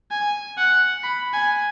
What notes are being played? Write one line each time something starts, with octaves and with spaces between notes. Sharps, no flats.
G#5
F#5
B5
G#5